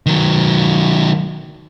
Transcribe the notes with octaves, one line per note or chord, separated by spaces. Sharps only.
D#3 F#3